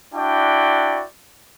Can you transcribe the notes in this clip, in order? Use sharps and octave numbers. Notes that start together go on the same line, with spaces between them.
D4 E4 F#4 D5 G5